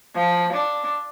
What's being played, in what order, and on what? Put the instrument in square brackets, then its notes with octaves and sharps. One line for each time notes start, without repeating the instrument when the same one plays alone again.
[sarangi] F3
D4